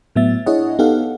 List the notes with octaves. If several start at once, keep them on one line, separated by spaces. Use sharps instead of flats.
A2 F#3 B3 E5 A6
D4 E4 G#4 C#5 D#5 F#5
B3 D#4 G4 A4 F5 F#5